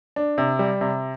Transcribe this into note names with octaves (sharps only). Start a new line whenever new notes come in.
D4
C3
G3
C3